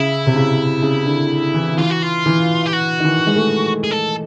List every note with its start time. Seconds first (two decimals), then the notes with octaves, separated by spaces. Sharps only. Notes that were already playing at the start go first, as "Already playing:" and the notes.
Already playing: C#3 E4
0.27 C3
0.35 C#3
0.83 C#3
1.06 D3
1.54 E3
1.77 E3 F4
1.90 F#4
2.02 F4
2.26 E3
2.66 G4
2.73 F#4
3.00 D#3
3.04 E3
3.27 G#3
3.36 A3
3.84 G#4
3.91 A4